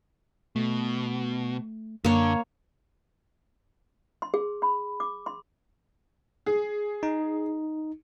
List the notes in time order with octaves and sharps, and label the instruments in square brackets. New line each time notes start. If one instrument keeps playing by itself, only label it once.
[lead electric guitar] B2 [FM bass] A3
[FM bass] F#2 [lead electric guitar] D3 [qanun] A#3 C#5
[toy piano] C6
G#4
B5
D6
C6
[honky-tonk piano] G#4
[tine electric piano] D#4